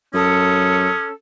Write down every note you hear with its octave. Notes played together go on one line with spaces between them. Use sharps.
F#2 C#4 A4 D#6